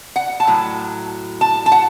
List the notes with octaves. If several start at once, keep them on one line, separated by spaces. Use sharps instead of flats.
F#5
A5
A2 F#3
A5
A5
F#5